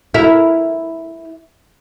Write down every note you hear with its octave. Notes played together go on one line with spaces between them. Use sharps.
E4 A#4